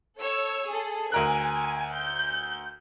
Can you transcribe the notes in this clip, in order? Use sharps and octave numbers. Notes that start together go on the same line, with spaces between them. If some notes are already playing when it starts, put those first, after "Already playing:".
A4 C#5 E6
G#4 A4
D2 A#4 G#5 F#6
G6